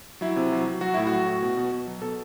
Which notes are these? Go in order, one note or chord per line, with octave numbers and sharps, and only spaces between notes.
F#3 E4
C3
F#3
F#3
F#3 F#4
A2 E4
F#4
F#3
A2
B2
B2
B2
F#3
B2 A4